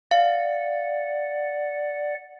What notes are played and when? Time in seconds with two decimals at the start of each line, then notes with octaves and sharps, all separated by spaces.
0.11 D5 F5 F#5